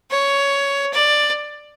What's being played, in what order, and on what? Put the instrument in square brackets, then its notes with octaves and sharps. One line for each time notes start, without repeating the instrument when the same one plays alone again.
[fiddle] C#5
D5